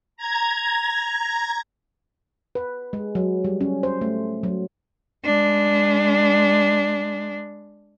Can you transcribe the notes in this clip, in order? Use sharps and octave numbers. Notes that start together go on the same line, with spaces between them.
A#5 G#6
B4
G#3
F#3
G3
C#4
C5
A3
F#3
G#3 D4